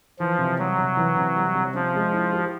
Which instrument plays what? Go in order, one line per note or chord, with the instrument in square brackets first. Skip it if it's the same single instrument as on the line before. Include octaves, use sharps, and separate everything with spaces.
[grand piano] E3 [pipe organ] F3
[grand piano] C3
[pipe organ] F#3 [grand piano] G3
[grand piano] C3
E3
C3
G3
C3
[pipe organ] F3 [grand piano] C#4
[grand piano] G#3
E4
G4